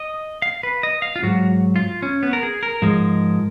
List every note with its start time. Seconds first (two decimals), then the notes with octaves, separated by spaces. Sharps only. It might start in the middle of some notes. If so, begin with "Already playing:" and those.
Already playing: D#5
0.42 F5
0.63 B4
0.83 D#5
1.02 F5
1.16 F4
1.23 G#2 F#3 F#4
1.76 F4
2.02 C#4
2.23 B3
2.33 A#4
2.43 G#4
2.63 A#4
2.82 G#2 F3 G#3